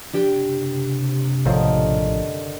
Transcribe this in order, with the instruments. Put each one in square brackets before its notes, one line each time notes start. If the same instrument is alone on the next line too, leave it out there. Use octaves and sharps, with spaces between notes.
[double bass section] F#1 C3 [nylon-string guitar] D4 G4 G5
[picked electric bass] A#1 A2 F3 [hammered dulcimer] D3 D#3